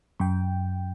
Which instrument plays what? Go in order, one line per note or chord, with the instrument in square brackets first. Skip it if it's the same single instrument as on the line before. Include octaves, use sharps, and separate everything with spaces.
[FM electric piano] F#2 G5